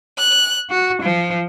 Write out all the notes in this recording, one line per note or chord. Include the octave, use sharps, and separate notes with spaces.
F#6
F#4
F3